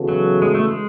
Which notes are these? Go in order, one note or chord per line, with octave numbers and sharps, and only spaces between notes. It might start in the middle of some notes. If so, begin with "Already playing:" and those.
Already playing: C#3 E3 B3 F#4 A4
F#3
G#3
A3
G#3